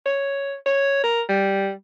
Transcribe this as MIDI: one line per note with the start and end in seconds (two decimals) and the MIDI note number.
0.06 0.54 73
0.66 1.00 73
1.04 1.22 70
1.29 1.72 55